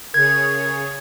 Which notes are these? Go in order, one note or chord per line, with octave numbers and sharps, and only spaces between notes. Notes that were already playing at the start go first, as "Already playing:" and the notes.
C#3 G#4 A#4 C#5 G#6